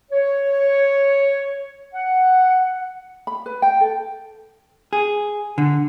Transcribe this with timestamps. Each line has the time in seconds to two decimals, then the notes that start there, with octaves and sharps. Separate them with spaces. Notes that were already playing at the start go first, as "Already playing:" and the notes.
0.11 C#5
1.94 F#5
3.27 B5
3.46 B4
3.62 G5
3.80 A4
4.93 G#4
5.58 D3